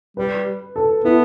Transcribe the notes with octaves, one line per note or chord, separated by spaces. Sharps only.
G3 B4
A4
B3 E4